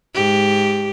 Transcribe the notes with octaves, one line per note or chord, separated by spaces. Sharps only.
G#2 G4